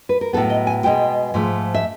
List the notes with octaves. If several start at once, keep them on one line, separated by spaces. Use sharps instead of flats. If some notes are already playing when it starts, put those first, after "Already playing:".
B4
A#4
A2 F#3 B3 A4
D#5
G#5
B2 G#3 B3 G5
G#2 F3 A3
E5